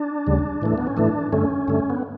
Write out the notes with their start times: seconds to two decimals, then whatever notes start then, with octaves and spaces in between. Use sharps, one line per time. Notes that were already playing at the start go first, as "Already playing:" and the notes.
Already playing: D4
0.27 D2 C#3 G3
0.62 A2 E3 A3
0.78 B3
0.87 C#4
0.97 A2 E3 A3 D4
1.32 G2 D3 A3 C#4
1.68 G2 D3 A3
1.90 B3